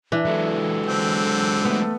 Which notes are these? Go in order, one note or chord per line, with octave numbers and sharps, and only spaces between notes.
E3 D4
F#3 G#3 A4
D3 C4
A3 B3